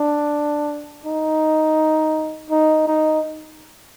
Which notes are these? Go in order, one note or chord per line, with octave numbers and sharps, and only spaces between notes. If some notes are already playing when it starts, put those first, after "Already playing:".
Already playing: D4
D#4
D#4
D#4